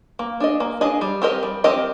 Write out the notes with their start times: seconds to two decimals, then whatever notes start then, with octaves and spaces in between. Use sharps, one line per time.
0.19 A#3
0.40 D4 G#4 D#5
0.60 A#3
0.81 D4 G#4 D#5
1.01 G3
1.22 C4 G4 A#4 D#5
1.43 G3
1.64 C4 G4 A#4 D#5